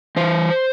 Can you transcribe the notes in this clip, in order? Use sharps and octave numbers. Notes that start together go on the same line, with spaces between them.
E3 C5